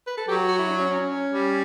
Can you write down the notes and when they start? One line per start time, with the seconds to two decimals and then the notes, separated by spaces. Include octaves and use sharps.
0.07 B4
0.17 A4
0.28 F#3 G4
0.38 F#4
0.49 F#4
0.59 E4
0.69 D4
0.80 C#4
0.90 C#4
1.32 G3